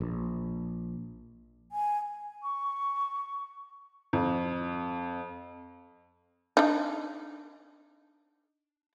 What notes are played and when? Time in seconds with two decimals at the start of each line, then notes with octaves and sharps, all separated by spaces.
0.01 A#1
1.72 G#5
2.42 C#6
4.13 F2
6.57 D4 D#4